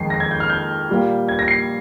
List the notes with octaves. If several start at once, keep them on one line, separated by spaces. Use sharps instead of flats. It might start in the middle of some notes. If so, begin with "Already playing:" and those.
Already playing: F2 D#3 G#3 C7
A#6
G#6
G6
F6
G6
A#2 G3 A#3
G#6
A#6
C7